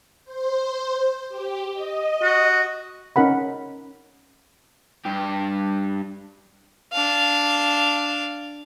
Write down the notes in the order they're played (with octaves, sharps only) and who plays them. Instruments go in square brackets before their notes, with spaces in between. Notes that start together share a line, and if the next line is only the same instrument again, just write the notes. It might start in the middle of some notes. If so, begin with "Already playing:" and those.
[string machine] C5
G4
D#5
[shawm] F#4
[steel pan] C#4 D#4 A#4 F#5 B5
[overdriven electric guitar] G2 G4
[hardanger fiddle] D4 F5